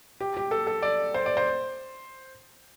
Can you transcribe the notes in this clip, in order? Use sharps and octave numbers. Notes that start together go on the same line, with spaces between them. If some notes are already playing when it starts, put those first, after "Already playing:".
G4
G4
A4
A4
D5
C5
D5
C5